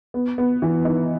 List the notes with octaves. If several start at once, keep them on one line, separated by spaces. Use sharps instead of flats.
B3
B3
E3
D#4